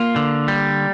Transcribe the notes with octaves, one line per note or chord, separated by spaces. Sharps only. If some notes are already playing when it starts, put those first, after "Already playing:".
Already playing: A#3 F4
D3
G3